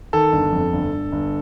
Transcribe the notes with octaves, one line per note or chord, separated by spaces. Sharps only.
D#3 A4
G1
F2
G1
G1
G1